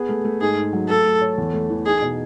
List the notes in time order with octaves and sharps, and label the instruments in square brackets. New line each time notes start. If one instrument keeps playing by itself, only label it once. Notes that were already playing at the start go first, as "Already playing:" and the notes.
Already playing: [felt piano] B3 G#4
A3
A3
[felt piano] G#2 [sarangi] G#4
[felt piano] G#2
F#3
[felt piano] A3 [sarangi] A4
[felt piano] A3
C#5
E2
A3
E3
[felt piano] D#4 [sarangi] G#4
[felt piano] B2